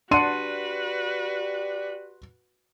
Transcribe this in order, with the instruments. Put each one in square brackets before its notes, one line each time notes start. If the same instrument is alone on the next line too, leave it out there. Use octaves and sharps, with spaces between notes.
[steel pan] D4 F#5 [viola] F#4 B4 [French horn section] G4 D5 [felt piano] C6 D#7